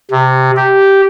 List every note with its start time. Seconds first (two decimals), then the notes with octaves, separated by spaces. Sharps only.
0.11 C3
0.56 G4